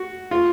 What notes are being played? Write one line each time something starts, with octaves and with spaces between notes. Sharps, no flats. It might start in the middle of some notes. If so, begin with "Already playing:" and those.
Already playing: F#4
F4